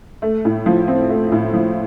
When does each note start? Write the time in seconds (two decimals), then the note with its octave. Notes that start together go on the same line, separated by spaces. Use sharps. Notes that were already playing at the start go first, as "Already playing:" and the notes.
0.22 A3
0.45 A2
0.66 F3
0.88 C4
1.10 A3
1.32 A2
1.54 F3